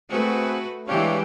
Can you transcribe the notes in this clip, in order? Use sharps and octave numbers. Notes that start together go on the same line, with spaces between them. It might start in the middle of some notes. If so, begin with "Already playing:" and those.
A3 C4 F#4 G#4 B4
E3 G#3 D4 G4 C#5 F5